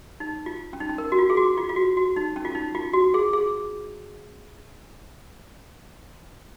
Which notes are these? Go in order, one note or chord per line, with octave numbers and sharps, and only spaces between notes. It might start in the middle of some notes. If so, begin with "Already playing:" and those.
D#4
F4
C#4
D#4
C#4
A#4
F#4
F4
G#4
F#4
F4
F4
F#4
F#4
D#4
C#4
F4
D#4
F4
F#4
G#4
G#4